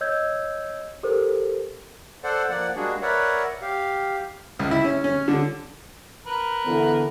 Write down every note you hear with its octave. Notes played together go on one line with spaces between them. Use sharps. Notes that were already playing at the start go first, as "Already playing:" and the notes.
C#5 D#5 E6 G6 G#6
G4 A4 A#4 C5
A4 C5 D5 F#5
F3 A#3 D5 F#5
G3 G#3 A#3 D4 F#4 G#4
A#4 B4 C#5 D5 E5 F#5
G4 F5
C#2
E4
C#4
C#4
D3
A#4 B4
D3 E3 B3